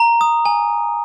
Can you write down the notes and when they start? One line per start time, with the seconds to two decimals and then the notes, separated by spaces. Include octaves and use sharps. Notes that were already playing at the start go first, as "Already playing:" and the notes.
Already playing: A#5
0.21 D#6
0.45 G#5